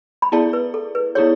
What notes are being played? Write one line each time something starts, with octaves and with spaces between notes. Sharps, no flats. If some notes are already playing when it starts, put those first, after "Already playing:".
B5
B3 E4 G#4 D5 A5
B4
A4
B4
B3 E4 G#4 C#5 D5